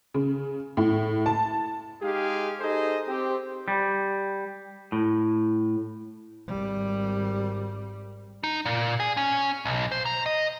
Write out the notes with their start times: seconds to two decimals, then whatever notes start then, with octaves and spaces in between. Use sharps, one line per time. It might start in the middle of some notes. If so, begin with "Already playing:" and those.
0.14 C#3
0.77 A2
1.26 A5
2.02 G#3 D#4 G4 G#4 F5
2.61 D#4 G#4 A4 C5 D#5
3.08 C4 G4
3.68 G3
4.92 A2
6.48 G#1 G3
8.44 D#4
8.65 A#2
9.00 G#4
9.17 C#4
9.65 B1
9.92 C5
10.06 A#5
10.26 D#5